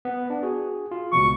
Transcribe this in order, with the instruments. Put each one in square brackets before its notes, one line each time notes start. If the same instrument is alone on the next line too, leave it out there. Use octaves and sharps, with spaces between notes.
[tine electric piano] B3
D4
F#4 G#4
F4
[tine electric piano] C#2 B2 F3 [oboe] C#6